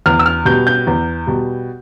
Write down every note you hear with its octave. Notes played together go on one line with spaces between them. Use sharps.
E2 F6
E6
F6
B2 G3 G6
G6
E2
B2 G3